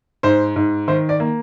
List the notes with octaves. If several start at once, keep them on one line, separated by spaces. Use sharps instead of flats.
G#2 C5
G#2
D#3 C5
D5
A#3